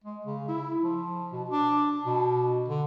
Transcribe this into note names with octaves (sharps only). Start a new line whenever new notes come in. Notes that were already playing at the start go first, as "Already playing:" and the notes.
G#3
C#3
E4
F3
B2
D4
B2
D3